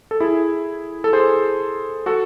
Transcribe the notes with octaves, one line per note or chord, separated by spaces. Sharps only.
A4
E4 G#4
A4
G#4 C5
F#4 A4